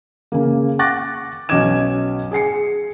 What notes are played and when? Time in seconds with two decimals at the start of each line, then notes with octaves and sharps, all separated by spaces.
0.32 C#3 A#3
0.79 C#6 D6 F#6 A6 A#6
1.49 B1 C#4 D#5 D6 G#6 E7
2.31 G#4 G#5 C7 C#7